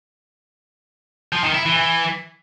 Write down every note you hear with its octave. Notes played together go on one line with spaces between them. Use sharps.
F3
D#3
E4
E3
E3